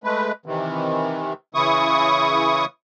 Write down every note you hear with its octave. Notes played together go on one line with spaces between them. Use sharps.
G#3 A3 B4
C3 D#3 E3
C#3 E3 E4 C#6 D#6